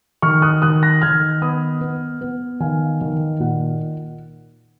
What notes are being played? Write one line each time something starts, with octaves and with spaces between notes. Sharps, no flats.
D#3 C#6 F6
D#6 F#6
D#3 D#6 F#6
F#6 A#6
D#3 F6 G#6
B3 B5 D#6
B3
B3
D#3 F5 G#5
D#3
A#2 F#5